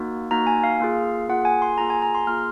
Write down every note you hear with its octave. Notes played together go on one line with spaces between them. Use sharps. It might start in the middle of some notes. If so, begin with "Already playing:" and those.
Already playing: A#3 D#4 F#4
A#3 D#4 F#4 A#5
G#5
F5
A#3 F4 G#4
A#3 F4 G#4 F#5
G#5
C6
A#3 F4 G#4 A#5
G#5
A#5
C6
A#3 F4 G#4 F6